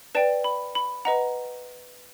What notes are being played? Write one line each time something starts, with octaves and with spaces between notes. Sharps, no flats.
B4 D5 G5 A5
B5
B5
B4 D#5 F#5 A#5